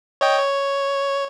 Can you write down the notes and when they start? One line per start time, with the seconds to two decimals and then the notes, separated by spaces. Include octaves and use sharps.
0.21 C#5 D#5 G5
0.39 C#5